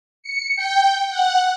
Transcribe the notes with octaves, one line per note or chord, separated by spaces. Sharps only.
C#7
G5
F#5